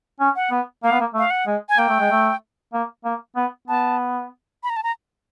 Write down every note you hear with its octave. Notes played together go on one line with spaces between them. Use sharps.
C#4
F#5
B3
A#3 F5
B3
A#3
A3 F5
F#5
G#3
G#5
A#3 G5
A3
G#3
A3
A#3
A#3
B3
B3 A5
B5
A#5
A5
A#5